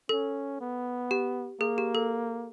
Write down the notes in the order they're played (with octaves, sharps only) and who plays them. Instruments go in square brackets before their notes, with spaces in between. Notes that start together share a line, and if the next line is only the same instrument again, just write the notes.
[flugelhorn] C#4 [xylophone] A4
[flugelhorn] B3
[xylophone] G4
[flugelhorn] A#3 [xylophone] G#4
[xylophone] G4
A4